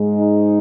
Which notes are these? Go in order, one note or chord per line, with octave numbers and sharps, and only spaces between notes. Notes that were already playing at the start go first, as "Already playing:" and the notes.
Already playing: G#2 G#3
D#4